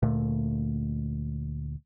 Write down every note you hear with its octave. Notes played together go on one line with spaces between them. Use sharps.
D2 A#2 A3